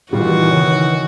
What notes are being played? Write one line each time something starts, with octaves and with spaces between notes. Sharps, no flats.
A#2 D#3 E3 G3 B3 C4 F4 F#4
C#3 C4 C#5